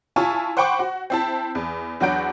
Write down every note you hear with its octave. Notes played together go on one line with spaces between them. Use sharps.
E4 F4 G#5 A5 C#6
C5 F#5 G5 B5 C#6 D6
F#4
C4 E4 A5
E2
E2 F#3 D4 F#4 G6 D7